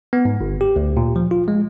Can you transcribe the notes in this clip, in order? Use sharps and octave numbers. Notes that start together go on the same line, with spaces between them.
B3
G#2
G1
G4
D2
A#2
F3
F4
G#3